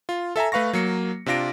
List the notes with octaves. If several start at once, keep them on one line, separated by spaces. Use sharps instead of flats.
F4
A4 E5 G#5 A#5
A3 B4 F5 C#6 A#6
F#3 A#3 C#7
C3 D4 F4 A#6 D7